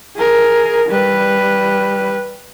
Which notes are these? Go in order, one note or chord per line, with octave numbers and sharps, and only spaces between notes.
G#4 A#4
G3 B4